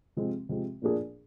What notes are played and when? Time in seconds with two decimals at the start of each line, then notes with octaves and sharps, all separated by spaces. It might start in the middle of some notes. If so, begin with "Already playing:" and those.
0.17 C3 F3 G#3 C4
0.49 C3 F3 G#3 C4
0.82 A#2 F3 A#3 D4 G#4